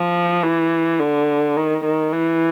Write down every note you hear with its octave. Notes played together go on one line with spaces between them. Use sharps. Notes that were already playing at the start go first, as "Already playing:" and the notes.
Already playing: F3
E3
D3
D#3
D#3
E3